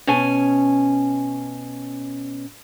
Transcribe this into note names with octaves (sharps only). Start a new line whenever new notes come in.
B2 C#4 G#5